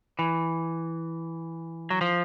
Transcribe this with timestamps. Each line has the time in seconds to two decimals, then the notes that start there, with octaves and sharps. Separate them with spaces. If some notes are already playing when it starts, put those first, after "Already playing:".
0.19 E3
1.90 F#3
2.01 F3